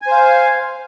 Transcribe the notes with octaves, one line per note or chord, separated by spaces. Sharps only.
C5 F5 G#5